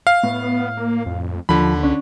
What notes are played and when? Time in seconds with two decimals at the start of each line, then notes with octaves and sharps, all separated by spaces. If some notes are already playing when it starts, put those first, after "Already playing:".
0.07 F5
0.23 A2 B3
0.77 A#3
1.06 F2
1.49 D#2 D3 F3 B5
1.83 C#2 C#4 D4